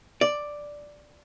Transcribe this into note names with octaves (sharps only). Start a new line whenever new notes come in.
D5